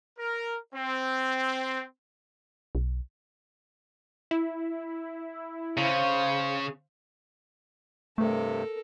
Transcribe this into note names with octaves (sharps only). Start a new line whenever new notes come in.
A#4
C4
B1
E4
C#3 C5 F5
G2 C3 A3 A4 A#4